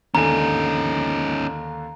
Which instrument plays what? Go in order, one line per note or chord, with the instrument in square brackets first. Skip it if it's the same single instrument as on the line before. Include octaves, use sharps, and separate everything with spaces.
[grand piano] D#2 D3 G#5 [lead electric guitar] C#4 D#4 [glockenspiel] A#5